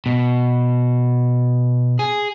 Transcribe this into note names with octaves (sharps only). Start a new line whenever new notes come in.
B2
G#4